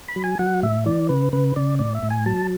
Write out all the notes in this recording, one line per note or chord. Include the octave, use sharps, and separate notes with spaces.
B5
F#3
G#5
F#3 F#5
A2 E5
E3 D5
C#3 B4
C#3 B4
C#3 D5
A2 D5
E5
A2
G#5
F#3 A5